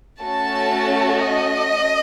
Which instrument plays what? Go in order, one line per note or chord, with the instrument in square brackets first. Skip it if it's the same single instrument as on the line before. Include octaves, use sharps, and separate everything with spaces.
[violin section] A3 C#4 F#4 A4 A5
D#5